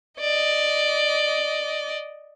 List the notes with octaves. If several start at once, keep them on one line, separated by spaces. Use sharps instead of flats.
D5 D#5